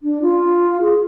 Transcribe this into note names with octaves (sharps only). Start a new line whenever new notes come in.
D4
F4
G#4